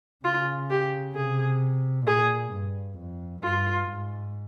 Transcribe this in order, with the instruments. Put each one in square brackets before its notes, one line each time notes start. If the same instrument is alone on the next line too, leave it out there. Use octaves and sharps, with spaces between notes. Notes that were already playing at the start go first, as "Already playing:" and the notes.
[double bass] C#3 [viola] F4
[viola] G4
[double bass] C3 [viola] G#4
[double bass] A#2 [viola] G#4
[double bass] G2
F2
[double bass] G2 [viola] F4
[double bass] G#2